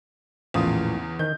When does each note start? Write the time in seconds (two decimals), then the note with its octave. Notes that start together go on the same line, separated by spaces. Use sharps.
0.54 A#1 E2 A2 C#3 F4 D#6
1.19 D#3 G6